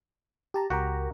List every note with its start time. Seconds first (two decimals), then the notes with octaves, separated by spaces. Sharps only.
0.54 G4 A5 A#5
0.70 C#2 F#4 G4 A#4 A#5